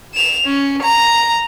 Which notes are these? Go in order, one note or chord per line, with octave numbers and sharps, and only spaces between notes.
E7 F7
C#4
A#5